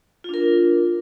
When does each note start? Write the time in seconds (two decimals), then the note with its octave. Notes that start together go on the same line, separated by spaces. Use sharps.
0.24 F4
0.29 D4
0.34 A#4